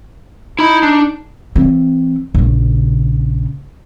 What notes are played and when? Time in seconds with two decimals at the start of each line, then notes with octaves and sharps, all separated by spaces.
0.59 D#4 E4 B5
0.83 D4
1.55 E3 C4
2.34 A#1 C#3